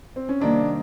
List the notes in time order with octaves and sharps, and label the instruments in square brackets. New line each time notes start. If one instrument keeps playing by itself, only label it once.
[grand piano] C4
C#4
[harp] C3 D#3 G3 A#3 [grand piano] D4